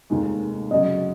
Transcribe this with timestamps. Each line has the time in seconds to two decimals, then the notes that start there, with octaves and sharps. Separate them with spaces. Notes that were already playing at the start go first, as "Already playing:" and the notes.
0.10 F1 D#2 D#3 G#3
0.71 F#2 C#3 F#3 D#5